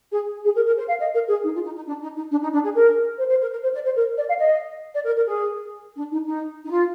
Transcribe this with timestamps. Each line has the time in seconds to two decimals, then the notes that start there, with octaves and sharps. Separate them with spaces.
0.11 G#4
0.44 G#4
0.55 A#4
0.65 A#4
0.76 C5
0.88 F5
0.98 D#5
1.14 A#4
1.28 G#4
1.43 D#4
1.54 F4
1.64 D#4
1.75 D#4
1.87 D4
2.01 D#4
2.15 D#4
2.30 D4
2.42 D#4
2.52 D4
2.63 G#4
2.74 A#4
3.18 C5
3.29 C5
3.40 A#4
3.51 A#4
3.62 C5
3.73 D5
3.84 C5
3.95 A#4
4.17 D5
4.28 F5
4.39 D#5
4.93 D5
5.05 A#4
5.16 A#4
5.27 G#4
5.96 D4
6.11 D#4
6.25 D#4
6.64 D#4
6.69 F4